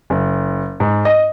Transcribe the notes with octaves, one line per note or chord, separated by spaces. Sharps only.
F#1
G#2
D#5